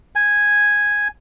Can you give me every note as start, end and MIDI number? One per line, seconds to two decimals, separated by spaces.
0.16 1.08 80